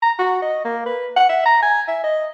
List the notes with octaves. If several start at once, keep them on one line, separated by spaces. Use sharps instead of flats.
A#5
F#4
D#5
A#3
B4
F#5
E5
A#5
G#5
E5
D#5